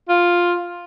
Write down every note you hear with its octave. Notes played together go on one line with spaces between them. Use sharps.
F4